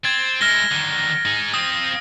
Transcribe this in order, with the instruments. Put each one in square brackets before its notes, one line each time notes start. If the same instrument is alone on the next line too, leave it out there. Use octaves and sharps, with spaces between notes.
[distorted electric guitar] C4 [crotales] G#6 A6
[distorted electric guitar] G#3 E4 [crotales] F6 A#6 G7
[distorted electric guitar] D3 D#3
D#4 G#4
[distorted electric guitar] C4 F4 [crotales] D#6